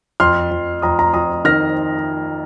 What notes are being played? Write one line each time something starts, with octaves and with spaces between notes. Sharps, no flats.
F2 C6 F6
F2
F2 A#5 D#6
A#5
F2 A#5 D#6
D#3 F6 A#6